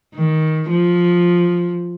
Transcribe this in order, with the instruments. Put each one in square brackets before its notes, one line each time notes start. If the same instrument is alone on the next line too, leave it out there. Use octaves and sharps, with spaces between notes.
[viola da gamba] D#3
F3